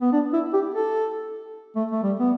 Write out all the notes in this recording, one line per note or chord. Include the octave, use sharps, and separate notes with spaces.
B3
D4
E4
G4
A4
A3
A3
G3
B3